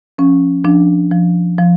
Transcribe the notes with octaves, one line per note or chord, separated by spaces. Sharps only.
F3 C#4
F3 D4
F3
F3